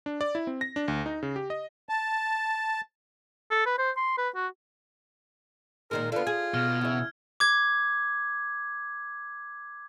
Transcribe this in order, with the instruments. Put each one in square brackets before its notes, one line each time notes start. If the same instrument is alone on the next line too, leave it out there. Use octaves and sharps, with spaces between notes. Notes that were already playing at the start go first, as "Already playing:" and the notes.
[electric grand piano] D4
D5
E4
C4
A#6
D4
D2
D#4
C#3
G4
D#5
[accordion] A5
[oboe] A4
B4
C5
C6
B4
F#4
[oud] A#2 D#3 G#3 [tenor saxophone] A#4
[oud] D3 B3 [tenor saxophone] F4
[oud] G#4 [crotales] G#6
[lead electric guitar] B2 [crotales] F6
[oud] E2 E5 [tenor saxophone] C#3
[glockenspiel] D6 G#6